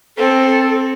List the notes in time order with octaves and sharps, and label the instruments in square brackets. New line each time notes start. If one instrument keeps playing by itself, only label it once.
[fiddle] C4 [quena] A4